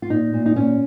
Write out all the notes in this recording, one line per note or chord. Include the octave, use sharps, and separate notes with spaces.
F4
A#2 D#4
A#2
D#4
A#2 C#4